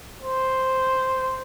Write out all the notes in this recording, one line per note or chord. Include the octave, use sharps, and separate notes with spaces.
C5